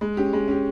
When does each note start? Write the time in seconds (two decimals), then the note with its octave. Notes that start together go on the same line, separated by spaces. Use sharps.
0.01 G#3
0.17 C#4 G4
0.33 G#3
0.48 C#4 G4